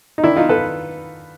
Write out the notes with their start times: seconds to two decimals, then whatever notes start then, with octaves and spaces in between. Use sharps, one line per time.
0.18 D#4
0.24 D#3 D4 E4
0.36 D#4 F4
0.49 D#3 A4 B4